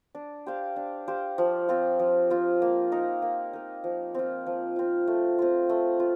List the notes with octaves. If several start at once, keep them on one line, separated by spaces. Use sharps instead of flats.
D4
G4 C5 F5
D4
G4 C5 F5
F3
C4 F4
F3
C4 F4
A#3
D#4 A#4
A#3
D#4 A#4
F3
C4 F4
F3
C4 F4
A3
C4 F4
A3
F4